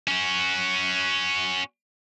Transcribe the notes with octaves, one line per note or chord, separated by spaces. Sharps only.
C#4 F#4